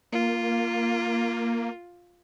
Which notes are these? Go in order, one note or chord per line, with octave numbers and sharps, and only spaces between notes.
A#3 F4